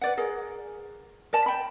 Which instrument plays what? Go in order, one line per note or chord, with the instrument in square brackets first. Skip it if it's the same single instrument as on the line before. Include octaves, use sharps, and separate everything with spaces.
[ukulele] B4 D5 F#5
G#4 A#4
A#4 D5 A5
G5 B5